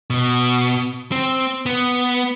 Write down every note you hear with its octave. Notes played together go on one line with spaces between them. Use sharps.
B2
C4
B3